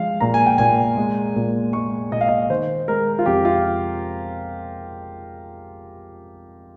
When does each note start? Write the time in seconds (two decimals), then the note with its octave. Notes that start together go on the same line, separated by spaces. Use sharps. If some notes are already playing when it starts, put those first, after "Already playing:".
Already playing: F3 G#3 F5
0.21 A#2 A#5
0.34 G#5
0.46 G5
0.58 A#2 G#5
0.97 G#3
1.36 A#2
1.73 G#3 C#6
2.11 A#2 D#5
2.21 F5
2.28 D#5
2.49 D#3 C5
2.88 G#3 A#4
3.19 F4
3.26 F2 G4
3.45 F4